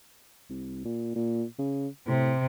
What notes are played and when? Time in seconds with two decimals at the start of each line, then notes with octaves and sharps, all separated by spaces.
0.50 C2
0.85 A#2
1.15 A#2
1.59 C#3
2.07 A2 C3